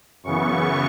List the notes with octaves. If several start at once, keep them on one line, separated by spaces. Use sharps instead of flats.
F#2 C#3 E3 B3 C#6